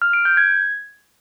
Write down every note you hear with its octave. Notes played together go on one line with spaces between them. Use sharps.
F6
D7
G6
G#6